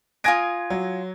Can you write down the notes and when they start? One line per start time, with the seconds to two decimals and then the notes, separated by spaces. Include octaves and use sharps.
0.24 F4 G#5 D#6 G#6 A#6 D7
0.70 F#3